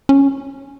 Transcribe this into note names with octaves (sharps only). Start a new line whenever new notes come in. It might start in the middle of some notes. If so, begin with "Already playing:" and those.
C#4